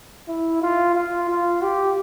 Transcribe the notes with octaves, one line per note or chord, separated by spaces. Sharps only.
E4
F4
F4
F4
G4